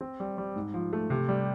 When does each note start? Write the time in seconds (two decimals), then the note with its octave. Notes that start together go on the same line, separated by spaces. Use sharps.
0.01 C4
0.20 G3
0.38 G3
0.56 G#2
0.74 F3
0.93 A3
1.10 C3
1.29 G3